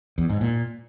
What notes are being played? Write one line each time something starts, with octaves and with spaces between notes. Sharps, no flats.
E2
G#2
A#2